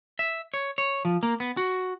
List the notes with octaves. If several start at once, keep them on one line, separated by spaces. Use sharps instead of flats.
E5
C#5
C#5
F3
A#3
B3
F#4